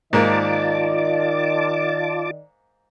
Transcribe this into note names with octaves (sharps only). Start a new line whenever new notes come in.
G#2 D#3 A#3 F4 D5 D#5 A5 D6